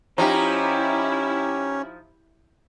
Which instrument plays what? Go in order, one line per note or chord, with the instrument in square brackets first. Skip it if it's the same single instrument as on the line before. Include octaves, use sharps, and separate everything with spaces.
[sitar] F3 D#4 [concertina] C#4 [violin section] E4 [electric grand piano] G4 A#5